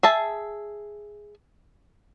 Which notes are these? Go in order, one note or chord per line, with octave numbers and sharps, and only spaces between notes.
G#4 E5 A5